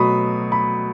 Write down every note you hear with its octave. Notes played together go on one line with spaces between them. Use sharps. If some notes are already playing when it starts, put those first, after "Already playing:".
Already playing: B2 F#3 A3 B5 C#6 D#6
B5